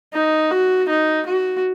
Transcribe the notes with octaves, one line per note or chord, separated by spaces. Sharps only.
D#4
F#4
D#4
F#4